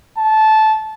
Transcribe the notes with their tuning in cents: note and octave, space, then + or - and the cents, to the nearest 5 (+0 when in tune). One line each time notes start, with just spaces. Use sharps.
A5 -15